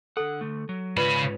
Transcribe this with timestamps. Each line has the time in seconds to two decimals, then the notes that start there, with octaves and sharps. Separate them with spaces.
0.17 D3 A4 F#5
0.41 D3 A3
0.69 F#3
0.97 G#2 C#3 C#4 F4 B4 D5 B5